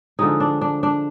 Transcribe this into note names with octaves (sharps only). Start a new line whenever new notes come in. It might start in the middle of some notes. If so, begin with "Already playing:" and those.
D3 F3 G#3 D#4
D4
D4
D4